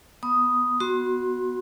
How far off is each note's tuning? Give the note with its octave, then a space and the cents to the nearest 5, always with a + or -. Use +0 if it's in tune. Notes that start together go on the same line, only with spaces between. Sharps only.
B3 +0 D#6 +0
B3 +0 F#4 +0 C6 +20